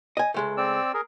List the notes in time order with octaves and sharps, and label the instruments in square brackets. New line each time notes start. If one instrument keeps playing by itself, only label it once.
[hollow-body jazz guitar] D#5 G#5
C#2 G#3 A3
[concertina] C4 D5 E6
G#4 A#4